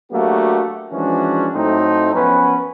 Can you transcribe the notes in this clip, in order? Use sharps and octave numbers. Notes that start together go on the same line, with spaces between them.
F#3 A3 A#3 D4 F#4 G4
E3 F3 G#3 C#4 D4 F#4
A2 F#3 A3 C4 D#4
F#2 F3 B3 C#4 B4